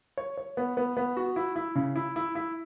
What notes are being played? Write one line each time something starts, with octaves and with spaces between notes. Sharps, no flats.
C#5
C#5
B3
B3
B3
F#4
E4
E4
C#3
E4
E4
E4